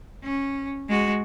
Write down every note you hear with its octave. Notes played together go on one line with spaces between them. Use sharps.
C#4
G#3 F#4